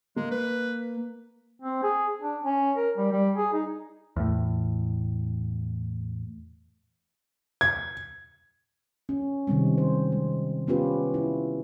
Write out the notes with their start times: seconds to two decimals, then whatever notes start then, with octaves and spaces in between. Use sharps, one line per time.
0.16 G#3 A#3
0.31 B4
1.62 C4
1.83 G#4
2.21 D4
2.43 C#4
2.77 A#4
2.97 G3
3.12 G3
3.37 G#4
3.53 D#4
4.16 E2 A2
7.61 G#6
9.09 C#4
9.47 C3 D#3 G3 G#3 C4
9.78 C5
10.12 G#3
10.67 B3 C#4 F4 G4 B4
11.14 E4